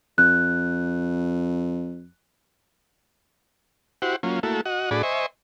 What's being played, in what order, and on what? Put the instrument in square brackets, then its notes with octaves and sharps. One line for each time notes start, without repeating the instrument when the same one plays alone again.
[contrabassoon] F2 [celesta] F#6
[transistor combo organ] E4 F#4 G4 C5 F#5
F#3 A#3 C#4 F4
A3 A#3 E4 F#4 A4
F#4 D#5 F#5
A2 D4 F#4 G#4 D5 B5
C5 D#5 E5 G#5 C#6